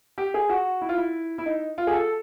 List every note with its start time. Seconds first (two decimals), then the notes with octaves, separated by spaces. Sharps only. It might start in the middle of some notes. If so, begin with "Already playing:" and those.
0.18 G4
0.34 G#4
0.49 F#4
0.81 E4
0.89 F4
0.97 E4
1.38 E4
1.46 D#4
1.78 F4
1.87 G#4
1.93 A4